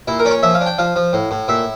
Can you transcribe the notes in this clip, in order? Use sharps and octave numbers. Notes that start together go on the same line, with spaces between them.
A#2 E4
A#4
C#4 D5
C#5
F3 E5
F5
D4
G5
F3 F5
F3
A2
A2
A#2 E5